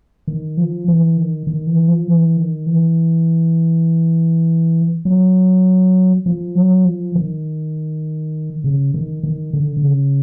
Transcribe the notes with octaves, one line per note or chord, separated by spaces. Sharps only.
D#3
F3
E3
D#3
D#3
E3
F3
E3
D#3
E3
F#3
F3
F#3
F3
D#3
C#3
D#3
D#3
D3
D3
C#3